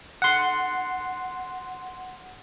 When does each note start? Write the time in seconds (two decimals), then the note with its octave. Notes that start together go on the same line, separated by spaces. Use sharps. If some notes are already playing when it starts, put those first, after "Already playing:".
0.22 F#5 C6